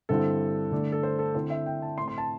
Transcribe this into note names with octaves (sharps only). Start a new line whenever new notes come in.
G2 D3 C4 E4 A4
D3 A3 D4
A4
C5
A4
D3 C4 E4 C5
E5
G5
A5
A2 A3 C4 C6
C6
A5